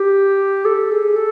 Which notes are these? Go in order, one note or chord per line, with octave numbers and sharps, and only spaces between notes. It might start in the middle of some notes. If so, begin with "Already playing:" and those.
Already playing: G4
A4
G#4
A4